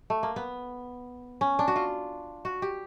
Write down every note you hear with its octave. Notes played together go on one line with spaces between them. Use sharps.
A3
A#3
B3
C#4
D4
F#4
F4
F#4
G4